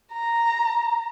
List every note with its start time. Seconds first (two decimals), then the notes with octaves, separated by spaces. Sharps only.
0.11 A#5